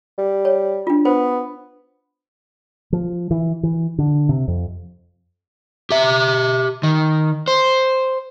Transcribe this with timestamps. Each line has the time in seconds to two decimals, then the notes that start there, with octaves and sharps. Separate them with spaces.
0.18 G3
0.45 C#5
0.87 D4 F4
1.05 B3 C5
2.93 F3
3.31 E3
3.63 E3
3.99 D3
4.29 C3
4.48 F2
5.90 G4 E5
6.83 D#3
7.48 C5